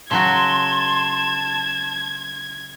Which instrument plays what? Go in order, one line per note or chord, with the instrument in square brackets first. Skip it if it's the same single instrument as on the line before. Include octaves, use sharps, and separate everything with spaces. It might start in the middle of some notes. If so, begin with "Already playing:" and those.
[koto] C#3 F#3 F#4 [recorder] A5 [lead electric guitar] C6 [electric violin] G#6